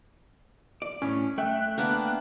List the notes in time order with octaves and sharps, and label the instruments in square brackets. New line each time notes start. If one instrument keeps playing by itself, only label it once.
[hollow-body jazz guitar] D5
[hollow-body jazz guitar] A2 [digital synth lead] C#4
[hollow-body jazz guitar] A3 [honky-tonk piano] E5 G5 [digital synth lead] F#6
[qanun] A#3 B3 D4